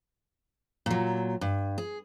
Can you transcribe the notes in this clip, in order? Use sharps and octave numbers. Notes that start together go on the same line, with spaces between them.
A#2 F#3
G2
G#4